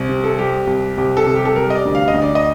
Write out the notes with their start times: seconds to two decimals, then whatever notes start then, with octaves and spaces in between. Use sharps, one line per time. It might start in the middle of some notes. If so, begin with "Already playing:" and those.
Already playing: C2
0.09 C3
0.24 A4
0.38 G3 G4
0.67 C2
0.97 C2 G4
1.17 A4
1.26 C3
1.36 G4
1.45 A4
1.56 G3 A#4
1.70 D#5
1.75 D5
1.85 D2
1.95 F5
2.08 D#5
2.14 D2
2.22 D5
2.35 D#5